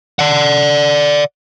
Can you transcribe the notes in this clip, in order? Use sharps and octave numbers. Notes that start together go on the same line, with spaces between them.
D5 F#5